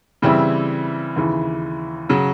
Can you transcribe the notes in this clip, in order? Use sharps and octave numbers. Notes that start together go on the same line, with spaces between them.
C#3 E3 G3 C4 E4
D#2 C#3 E3
C#3 F#3